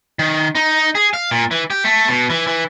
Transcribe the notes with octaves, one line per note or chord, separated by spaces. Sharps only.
D#3
D#4
G#4
F5
A#2
E3
G4
A3
B2
E3
E3